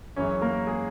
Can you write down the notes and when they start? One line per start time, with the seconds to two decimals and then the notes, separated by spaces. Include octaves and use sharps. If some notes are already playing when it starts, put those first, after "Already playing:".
0.16 F#2 E3 G#3 C#4 C#5
0.42 A#3 A#4
0.67 G#3 G#4